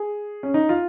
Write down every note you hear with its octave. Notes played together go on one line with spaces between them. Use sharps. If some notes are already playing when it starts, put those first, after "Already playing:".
Already playing: G#4
C#4
D#4
F4